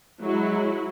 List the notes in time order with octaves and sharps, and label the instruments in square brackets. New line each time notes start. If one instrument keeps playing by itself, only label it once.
[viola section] F#3 E4 [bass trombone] G#3